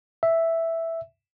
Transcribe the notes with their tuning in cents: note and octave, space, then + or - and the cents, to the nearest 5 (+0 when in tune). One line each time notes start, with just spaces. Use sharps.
E5 +0